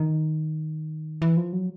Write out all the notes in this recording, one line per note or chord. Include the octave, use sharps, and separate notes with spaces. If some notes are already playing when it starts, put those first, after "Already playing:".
Already playing: D#3
E3
F3
F#3